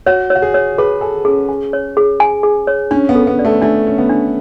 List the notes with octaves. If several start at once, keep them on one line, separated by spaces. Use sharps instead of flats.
F#4 C#5
F#4 C#5
G#4
C#5
G#4 B4
A4 G#5
C#4 G#4
G#5
C#5
G#4
G#5
G#4
C#5
C#4 D4
B3
A4
B3
D5
A3
A3 D4
C#4 D4
B3
D4